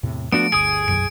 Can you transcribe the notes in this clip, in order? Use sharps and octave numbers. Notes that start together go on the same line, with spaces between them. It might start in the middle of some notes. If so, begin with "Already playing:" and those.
E2 A2 C3
F3 A3 B3 D4 F#4 D7
G1 D2 G#4 D#6 D7
F#1 B1 F#2 D7